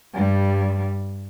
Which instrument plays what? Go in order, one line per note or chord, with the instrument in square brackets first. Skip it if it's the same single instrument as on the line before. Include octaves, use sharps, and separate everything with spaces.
[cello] G2 G3